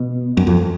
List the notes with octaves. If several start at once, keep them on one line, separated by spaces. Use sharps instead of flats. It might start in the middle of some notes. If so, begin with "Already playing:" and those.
Already playing: B2
F#2
F2